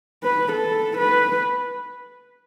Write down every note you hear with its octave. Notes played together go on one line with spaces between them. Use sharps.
B4
A4
B4